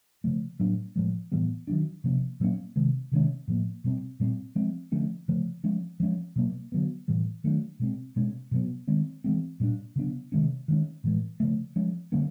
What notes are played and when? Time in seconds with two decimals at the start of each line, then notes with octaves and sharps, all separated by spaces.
0.24 C#3 F3 A3
0.60 A2 F#3 A#3 D4
0.96 A2 F3 G#3
1.32 A2 E3 G3 B3
1.67 D#3 F#3 A#3 D4
2.04 C3 F3 A#3 C#4
2.40 A#2 F#3 A#3 C#4
2.76 C3 D#3 G#3
3.12 C3 D#3 G#3 C#4
3.48 A2 F3 A#3
3.84 B2 G3 C4
4.20 A#2 G3 C4
4.55 F3 G#3 C4
4.92 D3 F3 A3 C#4
5.28 C#3 F3 A3
5.64 F3 G#3 C#4
6.00 F3 G#3 C#4
6.36 B2 F#3 A#3
6.72 D3 F#3 B3
7.08 A2 E3 G3
7.44 D#3 F#3 A3 D4
7.80 B2 G#3 C4
8.16 B2 G#3 C#4
8.51 B2 F#3 B3
8.88 D#3 G#3 C4
9.24 E3 G#3 C4
9.60 A#2 G3 B3 D4
9.96 C#3 F#3 B3 D4
10.32 C3 D#3 G#3 C#4
10.68 D#3 G#3 C#4
11.04 A2 E3 G#3
11.40 C#3 F3 A3
11.76 F3 G#3 C#4
12.12 D3 G3 A#3 C#4